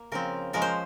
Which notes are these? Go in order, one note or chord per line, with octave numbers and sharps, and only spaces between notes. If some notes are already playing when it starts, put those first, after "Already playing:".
Already playing: A#3
C#3 F3 C4 A#4
F3 G#3 C#4 A#4
C5